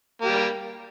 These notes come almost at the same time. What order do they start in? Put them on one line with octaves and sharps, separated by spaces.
A#3 G4 G3